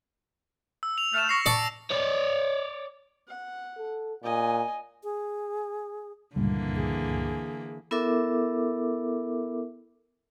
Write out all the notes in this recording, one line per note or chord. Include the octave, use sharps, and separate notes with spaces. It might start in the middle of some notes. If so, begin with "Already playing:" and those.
E6
F7
A3 F6 E7 F7
C#6 A#6 C7
D5 A5
C#5 D5
F#5
A4
A#2 D#5 G#5
G#4
C#2 G2 A#2 D3 E3 A#3
G#4
B3 E4 A4 A#4 E5 D6